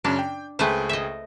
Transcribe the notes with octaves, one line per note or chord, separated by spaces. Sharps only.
F#2 C#3 C#4 D4
G5
C#2 A3 G#4 B4 C5 G5
D#5 E5